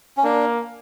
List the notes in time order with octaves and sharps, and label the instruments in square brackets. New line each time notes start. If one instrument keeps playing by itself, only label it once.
[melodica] C#4
[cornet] A#3 [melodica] D4